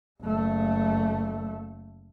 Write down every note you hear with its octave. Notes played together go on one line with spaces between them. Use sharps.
F#1 A3